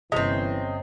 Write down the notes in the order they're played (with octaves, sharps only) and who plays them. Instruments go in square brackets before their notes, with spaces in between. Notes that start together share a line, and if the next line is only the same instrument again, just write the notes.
[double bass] G1 C#4 [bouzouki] C3 C4 [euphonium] E3 [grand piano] D#5